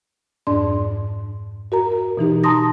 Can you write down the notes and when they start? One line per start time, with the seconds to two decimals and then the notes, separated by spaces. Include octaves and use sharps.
0.47 F2 G#2 D4 D5 C6
1.72 F#4 A#4 A#5
1.92 A#4
2.17 B2 E3 D#4 G4
2.44 A5 A#5 C6 D#6 A#6